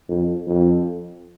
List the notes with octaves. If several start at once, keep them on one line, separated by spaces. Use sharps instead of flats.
F2
F2